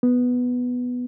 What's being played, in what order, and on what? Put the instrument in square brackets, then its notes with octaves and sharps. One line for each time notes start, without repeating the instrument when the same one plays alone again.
[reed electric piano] B3